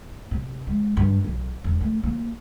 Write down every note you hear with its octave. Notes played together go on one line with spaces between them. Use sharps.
C3
G#3
G2
B1
E1
A3
A#3